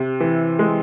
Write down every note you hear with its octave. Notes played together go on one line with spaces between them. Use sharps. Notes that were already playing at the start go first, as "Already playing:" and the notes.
Already playing: C3
E3
G#3